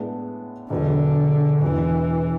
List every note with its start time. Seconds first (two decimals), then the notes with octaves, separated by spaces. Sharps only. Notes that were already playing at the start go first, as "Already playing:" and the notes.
Already playing: A2 G#3 B3 D4
0.70 E1 E2 B2 D3 F#3
1.62 E1 E2 B2 E3